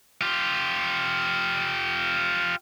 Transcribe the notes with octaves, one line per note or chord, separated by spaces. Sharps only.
F4 G4